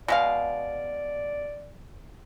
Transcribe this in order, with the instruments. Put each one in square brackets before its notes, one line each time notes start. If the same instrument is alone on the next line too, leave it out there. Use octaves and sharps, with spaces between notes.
[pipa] B2 G#3 F5 [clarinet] D5